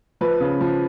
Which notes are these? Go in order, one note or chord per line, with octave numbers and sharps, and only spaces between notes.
F3 B4
C#3
F3